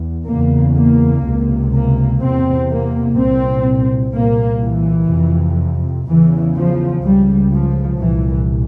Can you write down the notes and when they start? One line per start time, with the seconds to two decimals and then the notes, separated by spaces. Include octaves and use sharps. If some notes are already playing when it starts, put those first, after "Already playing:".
Already playing: E2
0.28 E2 C#3 A#3
0.76 A#3
1.25 C#2 C3
1.73 A#3
2.20 E2 C3 C4
2.70 A#3
3.17 C2 A#2 C4
4.14 C2 A#2 A#3
4.62 E3
5.10 F2 C3
6.07 E2 C#3 E3
6.56 F3
7.04 C#2 C#3 G3
7.53 F3
8.00 C2 A#2 E3